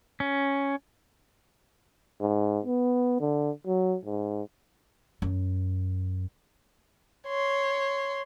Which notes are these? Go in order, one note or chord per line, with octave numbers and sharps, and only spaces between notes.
C#4
G#2
B3
D3
F#3
G#2
F#2
C#5 C6